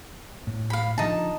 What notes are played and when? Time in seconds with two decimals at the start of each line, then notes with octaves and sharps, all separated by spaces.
0.47 A2
0.70 F5 B5
0.98 D3 F3 D#4 A5